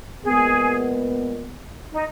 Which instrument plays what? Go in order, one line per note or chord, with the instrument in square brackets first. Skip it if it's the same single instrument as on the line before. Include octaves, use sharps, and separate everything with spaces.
[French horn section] A#2 G#3 B3 [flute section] G#4
[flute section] D#4